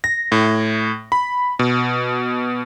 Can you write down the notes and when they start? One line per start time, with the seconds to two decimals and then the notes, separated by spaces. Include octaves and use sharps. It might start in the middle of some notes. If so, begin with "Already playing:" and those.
0.04 A#6
0.32 A2
1.12 B5
1.59 B2